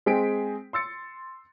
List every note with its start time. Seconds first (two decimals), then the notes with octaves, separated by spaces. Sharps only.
0.06 G#3 C4 G#4 G5 B6 D7
0.73 C6 E6 A6 C#7